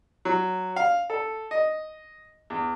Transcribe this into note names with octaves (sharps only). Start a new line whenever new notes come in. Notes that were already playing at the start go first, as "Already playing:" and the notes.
F#3
F5
A4
D#5
E2